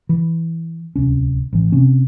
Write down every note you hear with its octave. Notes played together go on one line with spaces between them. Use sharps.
E3
D1 C2 C#4
A1 E3
C3 C4 C#4